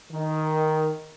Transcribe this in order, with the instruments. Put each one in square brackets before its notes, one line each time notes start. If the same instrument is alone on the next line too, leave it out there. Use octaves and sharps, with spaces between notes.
[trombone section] D#3